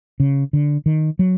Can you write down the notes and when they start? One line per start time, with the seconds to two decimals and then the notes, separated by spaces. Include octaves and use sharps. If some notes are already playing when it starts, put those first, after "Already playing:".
0.20 C#3
0.53 D3
0.86 D#3
1.19 F#3